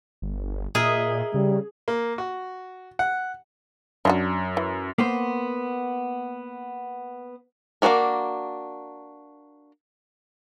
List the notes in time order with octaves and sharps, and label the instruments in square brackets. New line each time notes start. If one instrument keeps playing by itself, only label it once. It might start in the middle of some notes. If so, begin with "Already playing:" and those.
[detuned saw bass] G1
[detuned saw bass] A#2 [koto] G#4 [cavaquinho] A#4 D#5 E5
[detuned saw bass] C#3 [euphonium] G3
[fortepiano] A#3
F#4
F#5
[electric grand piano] F#2 [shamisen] D4 F4 F#4
[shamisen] E3
[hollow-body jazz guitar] A#3 B3 C5
[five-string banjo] A#3 C#4 D4 F#4 A#4